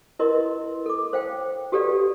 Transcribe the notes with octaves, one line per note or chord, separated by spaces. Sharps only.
E4 A#4 B4 D#5 C6
A4 D6
C5 F5 G5
F#4 G4 A4 B4 D5 F5